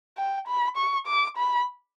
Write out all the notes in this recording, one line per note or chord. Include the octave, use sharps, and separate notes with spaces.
G5
B5
C#6
D6
B5